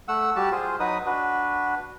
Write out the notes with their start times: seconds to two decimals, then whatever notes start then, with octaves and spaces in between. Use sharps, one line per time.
0.08 A3 F#5 E6
0.36 G3 F#4 G4 A5
0.52 F4 G#4 C5
0.80 F#3 D#4 B4 D#6
1.06 D4 F#4 B4